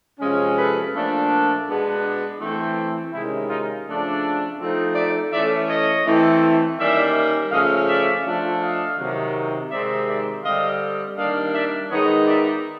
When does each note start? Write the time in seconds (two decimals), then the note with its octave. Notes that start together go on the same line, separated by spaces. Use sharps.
0.19 C3 F3 G#3 C#4
0.56 A4 B4
0.93 A#2 F3 A3 D4
1.66 B2 G#3 B3 D4
2.39 E3 A3 C4
3.12 C3 D#3 G#3 C#4 E4
3.48 D#4 F4
3.85 C#3 F3 A3 D4
4.59 F3 A3 C4 D#4
4.95 D5 E5
5.31 E3 A3 C#4 D5 E5
5.68 C#5 D#5
6.04 E3 A3 C4
6.77 D#3 G3 A#3 C#4 D5 E5
7.51 C#3 F3 A3 C#4 D#5 F5
7.87 D5 E5
8.24 F3 A3 D4
8.60 D#5 F5
8.98 C3 D#3 F#3
9.70 C3 D#3 G#3 C4 D#4 D5 E5
10.07 D5 E5
10.43 D3 G3 C4 D#5 F5
11.17 D#3 G3 A#3 D4 D#5 F5
11.53 D5 E5
11.90 D#3 G#3 B3 D#4 C#5 D#5
12.26 D5 E5